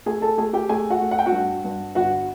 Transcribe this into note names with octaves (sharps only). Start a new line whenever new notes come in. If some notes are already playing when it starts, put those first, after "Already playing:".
A3 G#4 G#5
A4 A5
A3 G#4 G#5
G4 G5
A3 G#4 G#5
F#4 F#5
A3
F#5
G5
F#4 F#5
G2
G2
G1 F#4 F#5